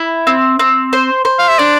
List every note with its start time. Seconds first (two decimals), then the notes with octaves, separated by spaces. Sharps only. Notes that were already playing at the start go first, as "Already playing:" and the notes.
Already playing: E4
0.27 C4
0.59 C4
0.93 C5
1.25 C5
1.39 F5
1.48 E5
1.58 D4 D5